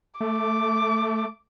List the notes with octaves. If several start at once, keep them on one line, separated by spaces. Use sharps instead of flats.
A3 D6